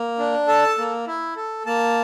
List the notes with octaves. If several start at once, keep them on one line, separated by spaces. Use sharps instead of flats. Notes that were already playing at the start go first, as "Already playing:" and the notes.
Already playing: A#3
D4
A4 A5
A#3
E4
A4
A#3 A5